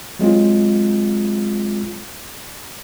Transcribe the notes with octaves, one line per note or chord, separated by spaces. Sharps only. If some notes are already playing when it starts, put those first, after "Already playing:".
F#3 G#3 C4 F4